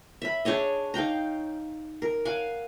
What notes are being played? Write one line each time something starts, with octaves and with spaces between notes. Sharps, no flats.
E5 B5
D4 G#4 C#5 D#5
D#4 F5 G5 A#5
A#4
F5 F#5 G#5